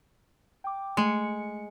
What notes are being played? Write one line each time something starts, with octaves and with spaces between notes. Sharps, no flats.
G5 D6
G#3 A3 C#7